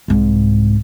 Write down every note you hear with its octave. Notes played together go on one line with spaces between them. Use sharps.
C2 G#2